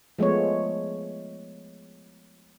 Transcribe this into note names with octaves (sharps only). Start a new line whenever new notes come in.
F3 G#3 A3 B3 C#5